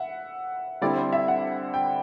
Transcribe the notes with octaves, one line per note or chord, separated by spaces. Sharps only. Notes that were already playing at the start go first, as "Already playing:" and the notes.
Already playing: E5 F#5
D3 G3 C4 E4 D5
C5
E5
F#5
G5